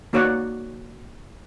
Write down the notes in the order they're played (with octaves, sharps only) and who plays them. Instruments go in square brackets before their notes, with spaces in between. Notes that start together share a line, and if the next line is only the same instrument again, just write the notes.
[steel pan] A#3 D#4 F#4 C#5 D5 F#5